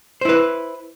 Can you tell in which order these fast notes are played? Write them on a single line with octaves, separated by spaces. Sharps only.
C5 E4 B4